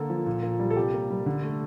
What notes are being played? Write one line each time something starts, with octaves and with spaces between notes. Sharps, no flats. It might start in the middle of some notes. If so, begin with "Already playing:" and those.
Already playing: D3 A#3 A4
F3
A#2
A#3
G3
A4
C3 G4
A#3
G3
D3
A3